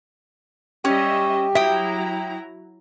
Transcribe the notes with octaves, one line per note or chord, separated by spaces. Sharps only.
G3 C#4 G4 D#5 E5
F#3 E4 E5 G5 A#5 D#6